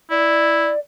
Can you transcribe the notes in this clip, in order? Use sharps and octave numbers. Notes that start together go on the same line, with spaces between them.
E4 D5